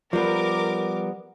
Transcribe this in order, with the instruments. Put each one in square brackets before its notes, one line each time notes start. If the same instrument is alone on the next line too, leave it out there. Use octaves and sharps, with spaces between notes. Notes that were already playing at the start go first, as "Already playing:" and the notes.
[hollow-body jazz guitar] F3 G3 B3 [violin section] A#4 D6